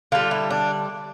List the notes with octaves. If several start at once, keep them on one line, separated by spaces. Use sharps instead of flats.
D3 G3 F4
E4
D4